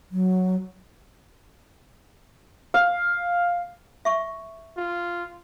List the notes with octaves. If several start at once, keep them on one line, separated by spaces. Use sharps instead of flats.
F#3
F5
E5 C#6
F4